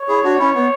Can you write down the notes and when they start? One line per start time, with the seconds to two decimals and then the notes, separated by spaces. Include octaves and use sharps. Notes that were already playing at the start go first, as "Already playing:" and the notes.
Already playing: C#5
0.08 E4 G#4
0.24 D4 F#4
0.39 C#4 E4
0.54 B3